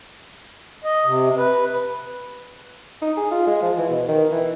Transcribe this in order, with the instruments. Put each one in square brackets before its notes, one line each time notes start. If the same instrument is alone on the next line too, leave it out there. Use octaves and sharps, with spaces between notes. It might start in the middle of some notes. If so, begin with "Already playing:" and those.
[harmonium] D#5
C3
B4
[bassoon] D#4
G#4
F4
G#3
F3
E3
B2
D#3
E3